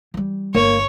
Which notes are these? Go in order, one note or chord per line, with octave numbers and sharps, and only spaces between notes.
E3 G3
G1 A#3 C#5